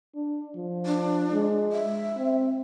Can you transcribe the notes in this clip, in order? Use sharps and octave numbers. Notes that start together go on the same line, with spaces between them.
D4
F3
D4
G#3
E5
C4